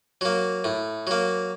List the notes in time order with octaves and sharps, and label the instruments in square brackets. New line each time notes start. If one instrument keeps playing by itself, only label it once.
[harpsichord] F#3 A#3
A2
F#3 A#3